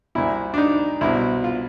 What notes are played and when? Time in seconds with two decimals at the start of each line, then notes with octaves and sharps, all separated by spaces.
0.15 C2 A#2 E4
0.54 D4
0.58 D#4
1.01 C2 B2 E4
1.44 F4